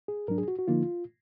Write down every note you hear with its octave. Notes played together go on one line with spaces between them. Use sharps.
G#4
G#2 F#3 D4 A#4
G#4
F#4
F#4
D3 F3 A#3 D#4 F4